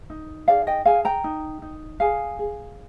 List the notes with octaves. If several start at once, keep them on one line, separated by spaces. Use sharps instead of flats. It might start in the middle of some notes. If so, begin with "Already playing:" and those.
D#4
G#4 D5 F5
D#5 G5
G#4 F5 G#5
G5 A#5
D#4
D#4
G#4 F5 G#5
G#4